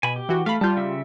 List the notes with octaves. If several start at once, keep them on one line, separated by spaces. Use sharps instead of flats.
B2 G#5 B5
G4
E3 F#4
A3 F5 B5
G3 F4 A5 G6
C#3 E5 E6